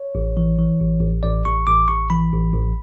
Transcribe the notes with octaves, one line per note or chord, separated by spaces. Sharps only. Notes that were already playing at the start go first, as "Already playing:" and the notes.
Already playing: C#5
A1
E3
E3
A1
A1
A1 D5
A1 C#6
A1 D6
A1 C#6
E3 B5
A1
A1